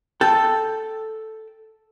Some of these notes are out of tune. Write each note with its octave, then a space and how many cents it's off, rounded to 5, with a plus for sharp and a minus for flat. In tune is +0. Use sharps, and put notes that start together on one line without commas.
A4 +0 G5 +0